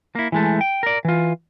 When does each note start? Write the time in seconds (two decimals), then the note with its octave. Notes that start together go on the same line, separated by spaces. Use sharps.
0.15 A#3 E4
0.32 E3 G#3 A3
0.61 G5
0.83 A#4 D5
1.05 E3 F4